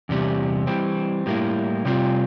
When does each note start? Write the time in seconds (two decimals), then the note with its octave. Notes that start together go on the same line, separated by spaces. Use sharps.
0.09 E2 C3 G3
0.67 E3 G3 C4
1.26 A2 G3 A#3 E4
1.85 C3 G3 C4 F4